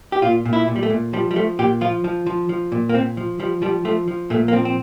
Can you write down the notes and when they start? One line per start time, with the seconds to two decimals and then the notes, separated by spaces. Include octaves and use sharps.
0.12 G4
0.22 A#2 F4
0.45 A#2
0.53 E4
0.68 A#2
0.76 G3
0.83 A3
0.90 A#2
1.13 F3 G3
1.31 G3
1.36 F3 A3
1.59 A#2 G4
1.81 F3 F4
2.04 F3
2.26 F3
2.49 F3
2.72 A#2
2.89 A#3
2.94 A#2 C4
3.17 F3
3.40 F3 G3
3.62 F3 G3
3.85 F3 A3
4.08 F3
4.30 A#2 A3
4.48 A#3
4.53 F3 C4
4.65 C4